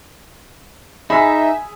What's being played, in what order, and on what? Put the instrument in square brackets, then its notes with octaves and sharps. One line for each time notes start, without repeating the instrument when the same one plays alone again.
[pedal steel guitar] D#4 [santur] G#4 [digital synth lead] E5 [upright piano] B5 E6 B6